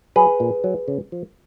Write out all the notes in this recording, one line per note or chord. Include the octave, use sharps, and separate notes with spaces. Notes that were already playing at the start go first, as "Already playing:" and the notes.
F#3 G#4 B4
A#2
F#3
C#3
F3